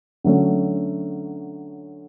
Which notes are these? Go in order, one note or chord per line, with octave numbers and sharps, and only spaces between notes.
D3 F#3 A3 C#4